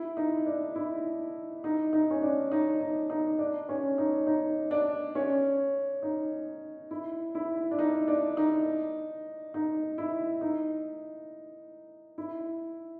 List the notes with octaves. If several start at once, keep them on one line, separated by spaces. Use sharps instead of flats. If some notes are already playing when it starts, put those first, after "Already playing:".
Already playing: E4
D#4
D4
E4
D#4
D#4
C#4
D4
D#4
D#4
D#4
D4
C#4
D#4
D#4
D4
C#4
D#4
E4
E4
D4
D#4
D4
D#4
D#4
E4
D#4
E4